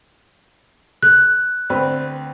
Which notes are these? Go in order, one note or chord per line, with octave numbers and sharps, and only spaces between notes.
F#6
D2 C4 B4